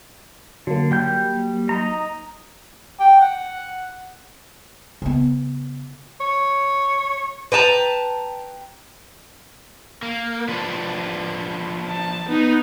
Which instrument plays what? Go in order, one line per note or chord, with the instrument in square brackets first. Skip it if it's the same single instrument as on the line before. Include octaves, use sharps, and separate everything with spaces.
[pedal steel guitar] D3 [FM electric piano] F#3 A#3
[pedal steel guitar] G3 G5 G6
D#4 A#5
[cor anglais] G5
F#5
[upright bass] C#3 B3
[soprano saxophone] C#5
[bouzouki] B4 G5 A5 A#5
[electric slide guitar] A#3
F3 D4 B4
[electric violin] A5
B3 D#4